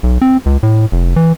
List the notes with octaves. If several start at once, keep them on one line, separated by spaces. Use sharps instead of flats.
B1
C4
C#2
A2
F1
E3